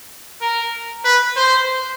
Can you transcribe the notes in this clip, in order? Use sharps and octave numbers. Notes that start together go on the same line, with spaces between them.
A#4
B4
C5